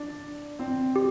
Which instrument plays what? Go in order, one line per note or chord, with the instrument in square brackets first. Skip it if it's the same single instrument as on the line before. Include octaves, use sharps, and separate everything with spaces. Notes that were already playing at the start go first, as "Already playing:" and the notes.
Already playing: [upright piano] D4
C4
[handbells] G4